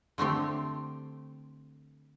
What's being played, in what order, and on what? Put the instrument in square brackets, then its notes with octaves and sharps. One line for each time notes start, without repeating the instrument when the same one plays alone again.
[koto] D3 A3 C4 G4